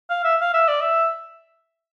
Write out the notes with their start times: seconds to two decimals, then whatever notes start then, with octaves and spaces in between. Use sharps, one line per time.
0.10 F5
0.24 E5
0.40 F5
0.54 E5
0.68 D5
0.81 E5